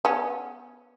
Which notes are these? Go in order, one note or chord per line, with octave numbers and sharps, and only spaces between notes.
B3 C#4